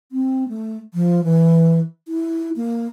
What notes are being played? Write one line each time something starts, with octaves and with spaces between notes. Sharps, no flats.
C4
A3
F3
E3
E4
A#3